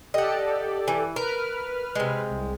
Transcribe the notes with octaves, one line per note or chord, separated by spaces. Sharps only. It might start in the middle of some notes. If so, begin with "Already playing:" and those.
G4 A4 D5 D#5 F#5
E3
A#4 B4 F6
C3 G#3
C2